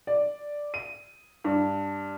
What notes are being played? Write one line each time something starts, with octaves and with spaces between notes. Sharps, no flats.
D5
D#7
G2